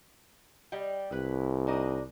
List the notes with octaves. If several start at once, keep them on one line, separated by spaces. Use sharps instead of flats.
G3 D#5 G5
C2 E4 B4
D4 D#4 D#5